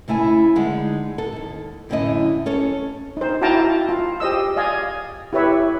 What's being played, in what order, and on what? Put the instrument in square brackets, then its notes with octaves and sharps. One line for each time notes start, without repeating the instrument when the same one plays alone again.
[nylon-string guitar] C#3 A3 E4 F5 G#5
D3 G#3 D#4 F#5
A4
D#2 G#2
F#2 A2 D3 C#4 E4 D#5
C#4 A4 C#5
[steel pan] D#4 C5
E4 F#4 F5 G5 A5 A#5
F4
G4 C5 D#5 E6
D5 D#5 F5 G#5
E4 G4 B4 C#5 E5